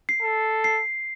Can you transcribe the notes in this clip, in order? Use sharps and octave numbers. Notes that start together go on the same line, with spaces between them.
C7
A4
C7